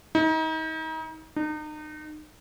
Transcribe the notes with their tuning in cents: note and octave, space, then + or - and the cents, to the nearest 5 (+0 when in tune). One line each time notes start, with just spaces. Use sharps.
D#4 +35
D#4 -35